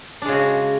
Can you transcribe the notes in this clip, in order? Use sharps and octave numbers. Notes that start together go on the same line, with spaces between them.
C#3 G#3 D4 F#4